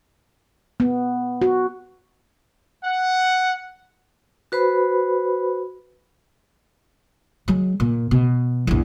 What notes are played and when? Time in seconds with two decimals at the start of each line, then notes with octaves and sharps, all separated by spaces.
0.80 B3
1.42 F#4
2.84 F#5
4.52 F#4 B4 C5 B5
7.48 F#3 G#3
7.80 A#2
8.11 B2
8.67 A#1 E2